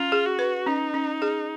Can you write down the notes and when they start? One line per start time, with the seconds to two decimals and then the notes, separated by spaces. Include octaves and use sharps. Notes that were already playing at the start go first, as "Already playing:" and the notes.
Already playing: C#4 F4
0.12 G#4
0.25 F#4
0.39 B4
0.66 C#4 D#4
0.94 C#4
1.22 G#4